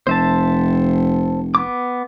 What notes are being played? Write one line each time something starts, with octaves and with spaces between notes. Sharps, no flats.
F1 C5 E5 A5
B3 D6